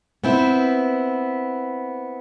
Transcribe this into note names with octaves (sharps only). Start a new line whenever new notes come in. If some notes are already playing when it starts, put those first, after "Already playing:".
B3 C4 E4